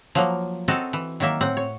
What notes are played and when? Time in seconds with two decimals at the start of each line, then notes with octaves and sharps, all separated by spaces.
0.15 F3 F#3 A#3
0.68 C4 F#4 A4 D#5 A5 A#5
0.93 E3
1.20 D#3 F#3 A#3 E5
1.41 A2 C4 F#5
1.57 C#5